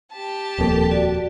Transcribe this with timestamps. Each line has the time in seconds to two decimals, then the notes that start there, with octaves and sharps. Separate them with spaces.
0.12 G4 A5
0.59 D#1 F2 A#3 A4
0.91 F#4 D5